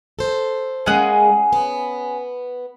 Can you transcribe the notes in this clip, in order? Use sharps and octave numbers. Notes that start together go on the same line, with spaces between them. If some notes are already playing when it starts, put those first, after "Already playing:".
A4 C5
C#3 G#3 A#3 C#4 G#4 F#5
B3